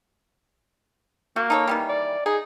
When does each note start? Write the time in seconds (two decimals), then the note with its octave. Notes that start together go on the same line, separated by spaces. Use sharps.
1.36 A#3 F#4
1.50 D#4 A4 C#5
1.67 D#3 E3 G3
1.89 D5
2.26 D#4 G#4